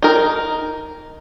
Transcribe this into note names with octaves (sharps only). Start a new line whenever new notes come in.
D#4 A#4